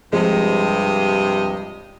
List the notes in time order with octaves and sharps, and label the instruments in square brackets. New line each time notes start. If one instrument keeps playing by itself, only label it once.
[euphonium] G2 [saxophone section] C3 D#5 [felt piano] F3 G#3 C4